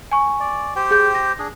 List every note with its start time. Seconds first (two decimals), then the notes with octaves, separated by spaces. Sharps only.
0.12 G#5 C#6
0.40 D5
0.76 G4 C5 G5
0.91 G#4 G6
1.15 A#6
1.39 D4 G#4